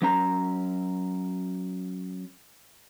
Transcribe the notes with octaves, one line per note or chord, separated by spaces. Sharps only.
F#3 C#4 A#5